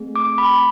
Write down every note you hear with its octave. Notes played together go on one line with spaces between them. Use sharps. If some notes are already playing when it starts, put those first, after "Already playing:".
Already playing: A3 C4 G#4
D6
B5